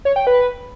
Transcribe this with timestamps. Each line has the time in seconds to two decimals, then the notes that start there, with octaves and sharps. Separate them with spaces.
0.05 C#5
0.16 G5
0.27 B4